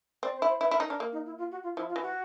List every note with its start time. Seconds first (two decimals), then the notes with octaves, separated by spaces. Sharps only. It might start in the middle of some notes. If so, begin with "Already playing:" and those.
0.23 C4 D5
0.36 C5
0.42 E4
0.48 C5
0.61 E4 B4
0.71 E4 A#4
0.80 D#4
0.87 A#4
0.90 D4
1.00 A#3
1.12 D#4
1.26 E4
1.38 F4
1.51 F#4
1.63 F4
1.76 F3 E4
1.89 F4
1.96 E3
2.02 F#4